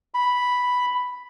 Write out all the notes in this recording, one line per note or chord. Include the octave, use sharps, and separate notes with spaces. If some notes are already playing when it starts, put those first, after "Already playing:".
B5